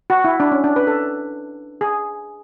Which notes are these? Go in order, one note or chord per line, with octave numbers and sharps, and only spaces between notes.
F#4
E4
D4
C#4
D4
B4
A4
G#4